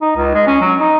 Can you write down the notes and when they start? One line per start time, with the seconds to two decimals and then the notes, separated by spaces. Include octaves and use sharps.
0.02 D#4
0.16 C#2
0.34 G#3
0.47 C#4
0.61 F#3
0.80 D#4